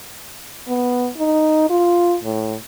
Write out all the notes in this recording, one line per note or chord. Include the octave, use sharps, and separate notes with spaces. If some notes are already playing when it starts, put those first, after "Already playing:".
B3
D#4
F4
A2